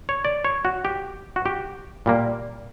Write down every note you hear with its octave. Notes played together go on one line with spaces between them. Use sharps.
C#5
D5
C#5
F#4
G4
F#4
G4
A#2 G3 A#3